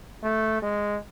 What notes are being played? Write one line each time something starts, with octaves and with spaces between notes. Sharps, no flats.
A3
G#3